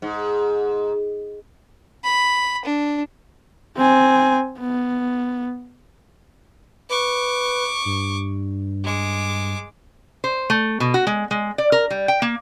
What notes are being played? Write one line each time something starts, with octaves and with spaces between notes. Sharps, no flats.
G#2
B5
D4
C4 G#5
B3
B4 C#6 D6
G2
G#3 D6
C5
A3
B2
F#4
G#3
G#3
D5
A#4
G3
G5
A#3